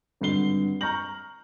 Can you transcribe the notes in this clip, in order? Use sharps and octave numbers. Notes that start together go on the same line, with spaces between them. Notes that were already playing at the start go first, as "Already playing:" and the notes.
G#1 G2 D3 C7 G7
A#5 C#6 F6 G6 A#6 F#7